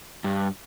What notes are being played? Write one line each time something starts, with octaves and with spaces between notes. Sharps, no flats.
G2